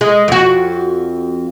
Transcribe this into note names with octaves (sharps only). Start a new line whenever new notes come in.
G#3
F2 F#4